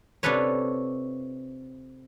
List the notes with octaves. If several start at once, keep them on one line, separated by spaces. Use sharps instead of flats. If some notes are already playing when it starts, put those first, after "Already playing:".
C3 D4 F4 A4 B4 C#5